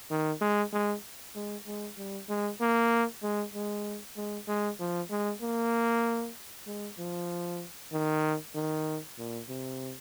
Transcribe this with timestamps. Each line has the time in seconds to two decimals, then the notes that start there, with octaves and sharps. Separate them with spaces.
0.11 D#3
0.41 G#3
0.73 G#3
1.35 G#3
1.67 G#3
1.98 G3
2.29 G#3
2.61 A#3
3.23 G#3
3.54 G#3
4.17 G#3
4.48 G#3
4.80 F3
5.10 G#3
5.42 A#3
6.67 G#3
6.98 F3
7.92 D#3
8.55 D#3
9.18 A#2
9.49 C3